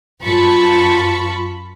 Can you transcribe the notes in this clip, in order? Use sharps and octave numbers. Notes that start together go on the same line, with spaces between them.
F#2 F4 A5 B5 C#6